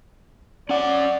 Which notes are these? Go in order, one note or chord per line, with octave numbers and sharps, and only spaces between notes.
C#4 D5 F#5